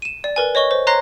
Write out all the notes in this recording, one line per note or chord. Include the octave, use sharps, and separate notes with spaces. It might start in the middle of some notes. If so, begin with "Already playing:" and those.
D#7 E7
D5
A#4 B4 G#5
C#5 D#5 C#6 G7
C5
C#5 A#5 C6 F#6 A#6 C7